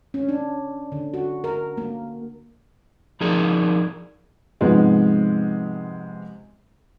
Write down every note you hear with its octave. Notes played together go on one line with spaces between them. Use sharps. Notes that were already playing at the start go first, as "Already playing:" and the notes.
C#4
D4
D3
F#4
A#4
A#3
F3 D#4 G#4 A#4 D5
G#2 C3 F3 G#3 B3